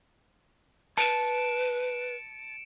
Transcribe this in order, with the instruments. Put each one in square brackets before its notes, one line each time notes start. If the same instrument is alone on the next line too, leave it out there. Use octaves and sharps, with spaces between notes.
[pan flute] B4 [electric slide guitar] A5 [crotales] C#7 D7 E7